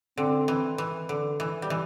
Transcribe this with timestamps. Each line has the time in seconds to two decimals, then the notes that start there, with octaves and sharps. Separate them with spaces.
0.17 D3 C4
0.48 E3
0.78 E3
1.09 D3
1.40 E3
1.62 G3
1.70 E3